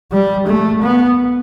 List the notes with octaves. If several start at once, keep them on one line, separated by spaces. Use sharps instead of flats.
G3
A3
B3